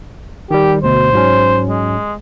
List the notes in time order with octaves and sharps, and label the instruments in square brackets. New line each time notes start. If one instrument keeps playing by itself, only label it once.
[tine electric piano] D#3 G3 [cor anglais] G4
[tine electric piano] D2 B2 [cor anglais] C5
[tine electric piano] G#2 F#3 C#4
[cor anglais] G#3